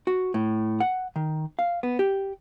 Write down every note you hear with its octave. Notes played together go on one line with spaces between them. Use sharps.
F#4
A2
F#5
D#3
F5
B3
G4